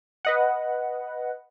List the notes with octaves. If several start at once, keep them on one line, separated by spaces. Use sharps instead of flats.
B4 D#5 F#5